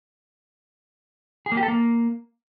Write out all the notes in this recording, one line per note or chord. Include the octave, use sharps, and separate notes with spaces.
G#4
A#3
G4
A4
A#3